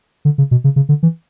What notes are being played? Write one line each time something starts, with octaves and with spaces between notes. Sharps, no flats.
D3
C#3
B2
C#3
C#3
D3
E3